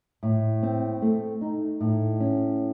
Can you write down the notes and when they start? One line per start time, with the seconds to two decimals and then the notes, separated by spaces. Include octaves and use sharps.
0.23 A2
0.63 C4
1.02 A3
1.41 D#4
1.80 A2
2.20 C#4